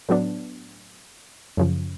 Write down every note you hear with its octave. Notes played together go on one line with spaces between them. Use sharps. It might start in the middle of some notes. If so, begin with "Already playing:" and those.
A2 F#3 B3 D4
F#2 C#3 F3